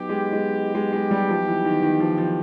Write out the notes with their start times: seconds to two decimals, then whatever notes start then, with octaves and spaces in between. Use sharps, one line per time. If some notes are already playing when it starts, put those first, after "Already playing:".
Already playing: F#3 B3 D#4 G4
0.09 G#3
0.33 G#3
0.75 G#3
0.93 G#3
1.11 G3
1.29 F3
1.47 E3
1.65 D#3
1.82 D#3
2.00 F3
2.18 F3